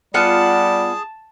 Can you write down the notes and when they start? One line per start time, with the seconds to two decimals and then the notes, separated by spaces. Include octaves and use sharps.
0.14 G3 B3 F4 G#4 F#5 A5